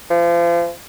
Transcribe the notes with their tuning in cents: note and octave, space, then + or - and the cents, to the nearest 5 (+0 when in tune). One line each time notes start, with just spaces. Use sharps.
F3 -35